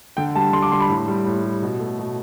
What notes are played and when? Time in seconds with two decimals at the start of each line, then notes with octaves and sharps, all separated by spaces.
0.17 D3 G5
0.35 G3 A5
0.53 D3 C6
0.62 D6
0.72 G3 C6
0.80 B5
0.89 A2
1.08 G3
1.27 A2
1.44 G3
1.62 B2
1.80 A3
1.99 B2